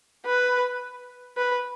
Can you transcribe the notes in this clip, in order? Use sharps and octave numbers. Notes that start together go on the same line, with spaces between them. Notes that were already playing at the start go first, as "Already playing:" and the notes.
B4
B4